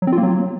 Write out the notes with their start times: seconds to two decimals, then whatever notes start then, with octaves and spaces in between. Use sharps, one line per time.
0.02 F#3
0.07 C4
0.12 F4
0.18 A#3
0.23 F#3